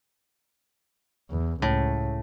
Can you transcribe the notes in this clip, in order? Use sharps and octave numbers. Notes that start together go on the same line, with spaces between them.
E2
C#2 A2